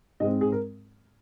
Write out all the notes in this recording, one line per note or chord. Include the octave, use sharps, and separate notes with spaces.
G#2 G#3 C4 D#5
G#4
A#4